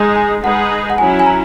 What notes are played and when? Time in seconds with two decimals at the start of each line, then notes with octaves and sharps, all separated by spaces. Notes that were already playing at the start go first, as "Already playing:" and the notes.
Already playing: G#3 D#4 G#4
0.16 G#5
0.43 G#3 D#4 G#4 B4 F#5
0.90 F#5
0.98 F#3 C#4 E4 G#5
1.19 G#5
1.26 A#5